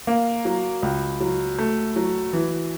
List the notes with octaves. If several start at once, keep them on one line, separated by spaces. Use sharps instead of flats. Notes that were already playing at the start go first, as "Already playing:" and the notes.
A#3
F#3
C#2
F#3
A3
F#3
E3